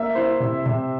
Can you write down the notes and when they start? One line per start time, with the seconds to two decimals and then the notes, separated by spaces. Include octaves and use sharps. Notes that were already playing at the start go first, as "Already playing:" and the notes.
Already playing: A#3 E5
0.15 E4 C5
0.40 C3
0.66 C3